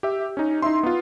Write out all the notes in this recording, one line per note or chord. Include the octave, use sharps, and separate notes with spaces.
G4 E5
C#4 D#4
D#4 E4 E5 C6
B3 F4